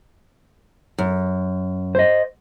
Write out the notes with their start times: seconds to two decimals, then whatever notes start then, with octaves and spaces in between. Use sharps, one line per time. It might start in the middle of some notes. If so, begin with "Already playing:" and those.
0.98 F#2
1.95 C5 D#5